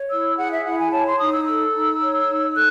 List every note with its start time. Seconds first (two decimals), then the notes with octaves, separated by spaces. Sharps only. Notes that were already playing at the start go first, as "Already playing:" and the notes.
Already playing: C#5
0.10 E4 E6
0.38 G#4 F#5
0.51 E5
0.65 E4 F#5
0.79 G#5
0.92 C#5 A5
1.06 C6
1.19 D#4 D#6
1.34 E6
1.47 A4 E6
1.74 D#4
2.02 C#5
2.28 D#4
2.55 A4 F#6